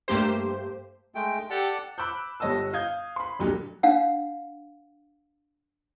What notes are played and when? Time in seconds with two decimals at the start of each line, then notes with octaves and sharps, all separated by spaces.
0.08 G2 A3 A#3 G4 C5
1.15 G#3 A3 G5
1.50 G4 A4 D5 F#5 A5
1.98 B5 D6 E6 F#6 G6
2.40 G1 G3 C#5 D#5 A5 E6
2.73 F5 D#6 G6 G#6
3.16 B5 C6
3.39 C2 F2 A#2 D3 F#3 G3
3.83 D4 F5 F#5